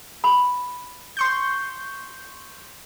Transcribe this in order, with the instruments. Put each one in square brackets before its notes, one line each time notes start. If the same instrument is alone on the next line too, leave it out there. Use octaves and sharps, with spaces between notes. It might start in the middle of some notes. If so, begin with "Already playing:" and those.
[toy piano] B5
[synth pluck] C6 C#6 G6